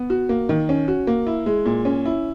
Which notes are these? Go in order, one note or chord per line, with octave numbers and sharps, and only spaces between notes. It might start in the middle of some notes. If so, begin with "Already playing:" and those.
Already playing: B3
F#4
A#3
D#3
C#4
F#4
A#3
E4
G#3
A#2
C#4
E4